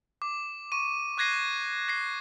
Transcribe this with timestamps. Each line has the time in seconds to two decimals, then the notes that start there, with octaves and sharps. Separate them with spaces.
0.22 D6
0.72 C#6 D#7
1.18 D6 F#6 G#6 A#6 C7 D#7
1.89 A#6 C7